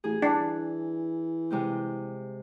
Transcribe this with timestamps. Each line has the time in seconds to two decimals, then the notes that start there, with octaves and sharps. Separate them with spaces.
0.04 A1 G#4
0.22 E3 D4
1.50 C3 G#3 C4